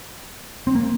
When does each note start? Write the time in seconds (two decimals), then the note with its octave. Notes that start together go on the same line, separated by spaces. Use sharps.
0.67 C4
0.75 A#3